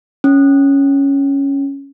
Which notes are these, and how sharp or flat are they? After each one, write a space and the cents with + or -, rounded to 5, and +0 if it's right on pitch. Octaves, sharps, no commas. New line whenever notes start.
C#4 +0